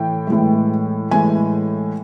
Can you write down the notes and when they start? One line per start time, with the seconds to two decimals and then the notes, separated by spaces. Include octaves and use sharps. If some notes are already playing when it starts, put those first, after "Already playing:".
Already playing: A2 E3 G5
0.27 A2 E3 G#3
1.11 A2 E3 G#3 G#5